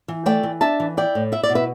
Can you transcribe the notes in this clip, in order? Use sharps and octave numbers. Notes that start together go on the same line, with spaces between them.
E3
A3 D5 G5
E3
D4 E5 A5
E3
E4 D5 G5
A2
E4 E5
D5
B2
B4 E5